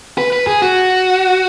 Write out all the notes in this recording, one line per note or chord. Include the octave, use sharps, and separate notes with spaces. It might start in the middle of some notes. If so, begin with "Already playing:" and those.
B4
B4
G#4
F#4